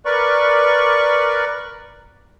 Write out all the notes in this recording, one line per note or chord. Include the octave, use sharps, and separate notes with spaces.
A#4 B4 D5 C#6